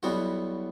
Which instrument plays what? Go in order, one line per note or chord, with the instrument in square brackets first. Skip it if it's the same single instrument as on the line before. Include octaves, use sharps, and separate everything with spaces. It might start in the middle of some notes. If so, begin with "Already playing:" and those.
[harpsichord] B1 B2 G3 B3 F#4 [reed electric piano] E4 G4
[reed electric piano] E4